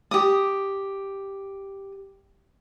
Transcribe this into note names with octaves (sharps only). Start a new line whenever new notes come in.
G4 D#6